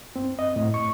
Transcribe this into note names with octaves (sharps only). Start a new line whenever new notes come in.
C4
D#5
A2
C#6